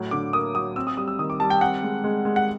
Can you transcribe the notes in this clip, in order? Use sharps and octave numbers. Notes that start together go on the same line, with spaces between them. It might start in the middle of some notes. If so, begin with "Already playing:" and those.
Already playing: A2 F#3
D3 D6
A#3 D#6
F#3 D#6
C4 E6
D#6
G3 D#6
E6
D#3 D#6
D6
G3 A5
G5
C4 F#5
G#3
G#3
G#3
F#5